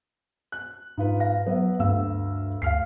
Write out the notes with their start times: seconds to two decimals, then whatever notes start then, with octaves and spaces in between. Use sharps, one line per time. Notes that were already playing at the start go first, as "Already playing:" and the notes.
0.52 F#6
0.97 G#2 D#4 F4 B4
1.20 F5 A#6
1.46 F#3 B3 B4 E5
1.79 D2 G2 F5 E6
2.62 D2 F5 F6 C7